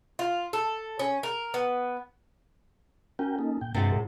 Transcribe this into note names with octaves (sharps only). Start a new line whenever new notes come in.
F4
A4
C#4
A#4
B3
C#4 F#4 A#4 G5
A#3 D#4 A4
A#2 G5
G2 C3 G#3 F#4 G5 A6
A2 G#4 A#4